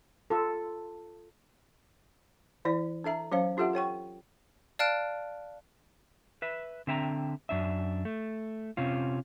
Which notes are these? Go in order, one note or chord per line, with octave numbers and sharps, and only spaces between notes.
F4 A4
E3 E4 D5
D4 A4 E5 A#5
F#3 C#4 C5 C#5 F5
D4 F4 G4 A4 E5 F#5
A4 C#5 G5 C#6
D5 F5 A5 F6 F#6 D7
B4 E5
D3 C4 E5 G5 A5 A#5
F#2 D4 E5
A3
C3 C#4 F4